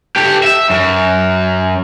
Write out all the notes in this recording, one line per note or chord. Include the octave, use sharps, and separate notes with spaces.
G4 A4
E5
F#2